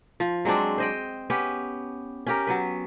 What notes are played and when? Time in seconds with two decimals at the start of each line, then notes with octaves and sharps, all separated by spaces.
0.20 F3
0.45 F#3 G#3 C4 D4
0.78 C5 D#5 G5
1.30 B3 C#4 G4
2.27 C#4 G4 A#4
2.47 F#3 B3 B4